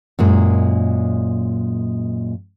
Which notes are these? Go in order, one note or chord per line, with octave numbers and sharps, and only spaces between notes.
F#2 A#2 G#3